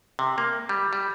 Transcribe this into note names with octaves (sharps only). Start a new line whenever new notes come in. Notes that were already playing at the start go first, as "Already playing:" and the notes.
C3
A#3
G3
G3